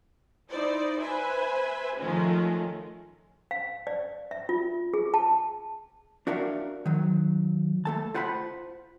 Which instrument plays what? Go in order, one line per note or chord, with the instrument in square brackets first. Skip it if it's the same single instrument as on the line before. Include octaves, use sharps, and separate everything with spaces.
[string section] D#4 E4 C5 D5
B4 C5 E5 G#5
D#3 F3 G#3 A3 C#4 F4
[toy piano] F5
D5
E5
F4
G#4
A5
[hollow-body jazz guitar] D4 F#4 A#4 E5 F5
D#3 F#3
A3 A4 A5
F4 C5 F#5 A5 B5